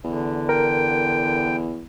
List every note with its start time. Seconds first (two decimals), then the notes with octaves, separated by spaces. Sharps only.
0.04 E2 D3
0.49 A#4 G5